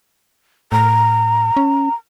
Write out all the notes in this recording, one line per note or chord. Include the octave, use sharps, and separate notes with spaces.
A2 A#5
C#4